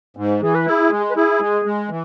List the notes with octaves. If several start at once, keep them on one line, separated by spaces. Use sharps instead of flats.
G#2
E3 G#4
B4
E4 G#4
G#3
B4
E4 G#4
G#3
G#3
E3